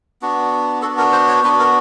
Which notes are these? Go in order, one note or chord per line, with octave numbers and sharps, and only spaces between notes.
B3 D4 F#4
B3 D4 F#4 A4
A#4
C5
C#5
B3 D4 F#4 B4
A#4